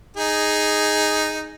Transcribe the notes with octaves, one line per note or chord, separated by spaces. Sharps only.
D#4 G#4